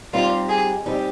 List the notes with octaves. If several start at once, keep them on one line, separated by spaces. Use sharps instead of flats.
G3 C4 D#4 F4 G4
G#4
G3 C4 D#4 G4